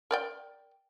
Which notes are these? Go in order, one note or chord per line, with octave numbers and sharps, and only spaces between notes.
A#4 D5 G5